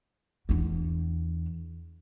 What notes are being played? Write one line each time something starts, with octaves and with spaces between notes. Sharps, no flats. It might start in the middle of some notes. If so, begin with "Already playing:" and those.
E2 D4